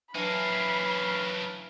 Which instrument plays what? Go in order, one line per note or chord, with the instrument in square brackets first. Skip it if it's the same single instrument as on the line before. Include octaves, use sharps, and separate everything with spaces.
[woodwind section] E3 F#3 D4 [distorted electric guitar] A#3 C#4 [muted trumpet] F5 [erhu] B5